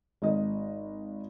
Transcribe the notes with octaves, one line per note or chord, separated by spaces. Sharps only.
G#1 D#5